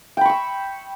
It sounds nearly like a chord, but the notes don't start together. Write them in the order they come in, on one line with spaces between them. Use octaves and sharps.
G5 B5 C#6 E6